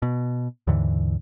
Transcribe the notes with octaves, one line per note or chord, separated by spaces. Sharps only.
B2
D#2 G#2 D3 E3